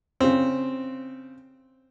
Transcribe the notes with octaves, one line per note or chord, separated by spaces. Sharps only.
C#3 C4